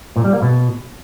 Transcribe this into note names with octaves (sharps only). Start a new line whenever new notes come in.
A#2
G3
A#3
B2